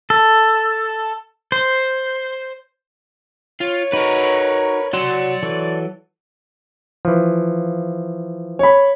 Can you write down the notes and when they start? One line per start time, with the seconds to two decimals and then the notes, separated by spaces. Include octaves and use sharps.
0.10 A4
1.52 C5
3.61 F4 C#5
3.93 D#4 F#4 A#4 B4
4.93 F#3 F#4 D5 C6
5.43 E3 F#3 A4
7.05 E3 F3
8.59 C#5 B5